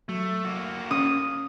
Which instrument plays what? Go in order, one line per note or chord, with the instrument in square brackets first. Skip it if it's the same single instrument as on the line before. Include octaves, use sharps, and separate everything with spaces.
[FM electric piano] F#3 [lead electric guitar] A3
[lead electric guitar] A#3 F#4
[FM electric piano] C#4 [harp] D#6